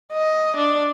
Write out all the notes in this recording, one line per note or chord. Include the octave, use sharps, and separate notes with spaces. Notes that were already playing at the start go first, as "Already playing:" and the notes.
D#5
D4